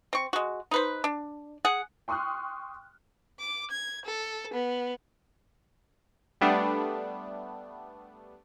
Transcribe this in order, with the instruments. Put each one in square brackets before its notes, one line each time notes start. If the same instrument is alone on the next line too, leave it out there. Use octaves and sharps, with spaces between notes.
[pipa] C4 C#6
G#3 F#4
D#4 B4 C5
D4
G#4 F#5
[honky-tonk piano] G5 C6 C#6 D#6 F6 F#6
[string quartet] D6
G#6
A4
B3
[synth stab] G3 A3 B3 D4